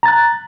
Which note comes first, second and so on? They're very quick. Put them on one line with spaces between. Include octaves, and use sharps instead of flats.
A#5 A6 F#6